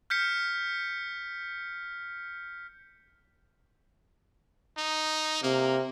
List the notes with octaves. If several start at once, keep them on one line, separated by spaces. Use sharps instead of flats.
F6 G6 B6 C#7
D#4
C3 A#3